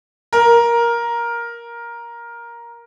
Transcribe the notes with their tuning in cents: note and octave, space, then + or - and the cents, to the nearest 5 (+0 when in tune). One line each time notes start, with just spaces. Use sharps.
A#4 +10